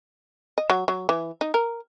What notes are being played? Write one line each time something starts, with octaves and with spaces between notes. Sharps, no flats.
D#5
F#3
F#3
E3
D#4
A#4